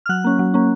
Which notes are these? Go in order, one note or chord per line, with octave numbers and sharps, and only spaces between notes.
F6
F#3 F#6
A#3 C#4
F#3
A#3 C#4